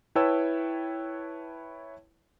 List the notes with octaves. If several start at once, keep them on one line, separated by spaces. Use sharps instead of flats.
E4 B4 C#5 G5 A5 E6